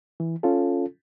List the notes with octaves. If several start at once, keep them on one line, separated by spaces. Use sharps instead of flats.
E3
C#4 F4 A4